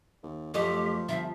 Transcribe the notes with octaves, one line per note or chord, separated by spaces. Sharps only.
D#2
F#2 F3 A3 G4 D#5
G1 F3 E5